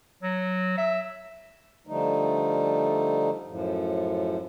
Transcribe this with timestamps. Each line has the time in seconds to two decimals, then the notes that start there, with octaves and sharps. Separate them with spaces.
0.23 F#3
0.78 E5
1.87 D3 F3 G3 A3 D#4
3.47 F#2 A2 F3